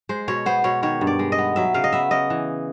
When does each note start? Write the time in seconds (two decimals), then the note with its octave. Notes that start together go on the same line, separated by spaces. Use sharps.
0.09 G#3 C5
0.28 B2 C#5
0.46 B3 C5
0.64 B2 C#5
0.83 D#3 C#5
1.01 G2
1.07 D5
1.19 G#3
1.32 D#5
1.38 B3
1.56 F#3 E5
1.74 C#3 F5
1.84 D#5
1.92 B3 E5
2.11 C#3 D#5
2.30 E3